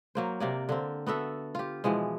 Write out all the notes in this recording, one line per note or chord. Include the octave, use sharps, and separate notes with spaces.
F#3 A#3 C5
C3 A#3 D5
D3 A#3 C4
B3 F#4 A4 E5
F4 G4
B2 E3 F3 G#3